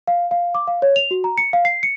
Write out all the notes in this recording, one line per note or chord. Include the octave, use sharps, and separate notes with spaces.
F5
F5
D6
F5
C#5
F7
F#4
A#5
C#7
F5
C7
C#7